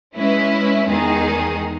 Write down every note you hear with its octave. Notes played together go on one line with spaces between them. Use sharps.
G#3 C#4 E4 B4 E5
E2 D#3 G#3 D#4 G#4